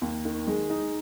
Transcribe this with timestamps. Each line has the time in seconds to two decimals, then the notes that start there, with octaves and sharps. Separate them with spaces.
0.02 D#2
0.25 D#3
0.47 G#3
0.70 D#4